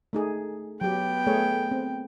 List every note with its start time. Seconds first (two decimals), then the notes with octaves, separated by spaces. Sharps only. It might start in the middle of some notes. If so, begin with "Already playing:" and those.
0.13 A3 D#4 G#4
0.81 F#3 B3 G4 G5
1.27 A3 G#4 C#5
1.71 C4